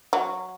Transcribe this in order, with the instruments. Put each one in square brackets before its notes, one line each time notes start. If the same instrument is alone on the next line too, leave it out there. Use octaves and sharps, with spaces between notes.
[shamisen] F#3